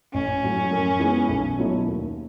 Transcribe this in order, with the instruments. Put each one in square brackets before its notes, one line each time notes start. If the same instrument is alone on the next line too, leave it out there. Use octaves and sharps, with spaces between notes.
[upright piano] A1 [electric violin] C#4
[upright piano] A2 F#3
F#2
E3 G#3 B3
B1
B2 F#3 A3 E4
D#2